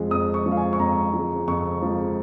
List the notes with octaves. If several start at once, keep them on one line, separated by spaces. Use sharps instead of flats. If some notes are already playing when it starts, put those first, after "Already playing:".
Already playing: F2 F3 G#3
F2 D#6
C#6
F3 G#3
F5
G#5
C#6
F2 A#5
F3 G#3
F2 C#6
F3 G#3